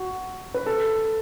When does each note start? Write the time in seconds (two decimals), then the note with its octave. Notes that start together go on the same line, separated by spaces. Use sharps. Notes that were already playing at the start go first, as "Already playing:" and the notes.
Already playing: F#4
0.54 B4
0.66 A4